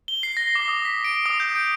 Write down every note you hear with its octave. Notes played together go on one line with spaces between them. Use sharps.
G7
C7
A#6
D6
D#6
B6
D7
D#6
G6
D7